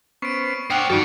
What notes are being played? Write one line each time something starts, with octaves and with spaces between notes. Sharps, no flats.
B3 C#4 C5 C#6 D7
D4 C5 F#5 G5 D#6 F6 F7
G2 D#3 F3 D#4 F#4 A4 D5